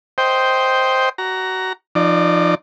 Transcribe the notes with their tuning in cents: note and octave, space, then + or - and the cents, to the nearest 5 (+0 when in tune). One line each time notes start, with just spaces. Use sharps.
C5 +0 D#5 +10 G5 +0
F#4 +20 A#5 +0
F3 -10 D#4 -30 D5 +0